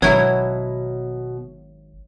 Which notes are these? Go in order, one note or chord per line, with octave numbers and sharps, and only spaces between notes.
G#1 B2 F#3 E4 C#5 G#6